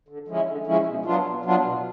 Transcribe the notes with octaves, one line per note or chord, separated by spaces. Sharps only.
D3
F3 G#3 C#4 E4
D3
F3 G#3 C#4 E4
B2
F#3 B3 D4 F4
B2
F#3 B3 D4 F4
B2